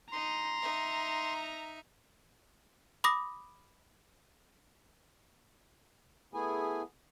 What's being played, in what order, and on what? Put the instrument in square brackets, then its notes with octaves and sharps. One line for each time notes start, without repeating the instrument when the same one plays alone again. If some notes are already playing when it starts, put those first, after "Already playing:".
[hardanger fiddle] D#4 [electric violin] A#5 [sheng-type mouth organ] C6
[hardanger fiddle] D#4 E5
[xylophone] B5 D6 D#6 A#6
[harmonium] A3 B3 E4 G#4 G#5